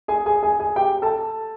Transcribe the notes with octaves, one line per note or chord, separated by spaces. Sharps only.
G#4 G#5
G#4 G#5
G#4 G#5
G#4 G#5
G4 G5
A4 A5